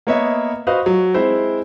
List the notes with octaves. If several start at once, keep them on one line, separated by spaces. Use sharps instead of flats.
A#3 B3 C#5 D#5 E5
F#4 B4 C5 D#5 F5 D#6
F#3
G#3 C4 E4 C5